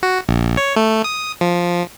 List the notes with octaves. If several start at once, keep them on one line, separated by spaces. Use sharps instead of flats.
F#4
A#1
C#5
A3
D#6
F3